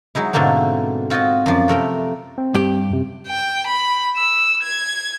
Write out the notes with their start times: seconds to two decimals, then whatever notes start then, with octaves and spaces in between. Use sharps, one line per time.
0.15 F#3 G#3 D#4 E4
0.33 G#2 B2 D3 A3 A#3 C4
1.10 C4 F4 F#4 C5 D#5
1.46 F#2 F3 D5
1.68 C3 A3 A#4 G5
2.38 C4
2.55 G2 G4
2.90 F#2 C3
3.28 G5
3.67 B5
4.17 E6
4.63 G#6